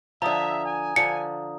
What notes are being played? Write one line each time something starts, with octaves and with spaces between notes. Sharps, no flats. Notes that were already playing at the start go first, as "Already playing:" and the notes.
D3 F3 E5 A#5 D#6
G#5
D3 F3 C#7